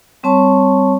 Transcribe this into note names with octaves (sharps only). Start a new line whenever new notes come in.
G3 C4 C#5 A5 C#6